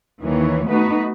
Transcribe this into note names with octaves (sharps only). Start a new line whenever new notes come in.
D#2 D#3 E3 C#5
A3 B3 D#4 F#4 B4